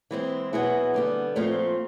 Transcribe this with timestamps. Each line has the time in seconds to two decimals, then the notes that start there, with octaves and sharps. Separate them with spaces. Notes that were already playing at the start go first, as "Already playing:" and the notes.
0.11 E3 G#3 C4 E4
0.53 B2 F#3 B3 E4 G#4
0.94 D3 G3 B3
1.36 A#2 F3 A3 C4